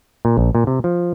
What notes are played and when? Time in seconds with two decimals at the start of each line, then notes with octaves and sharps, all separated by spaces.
0.25 A#2
0.37 A#1
0.55 A#2
0.67 C3
0.84 F3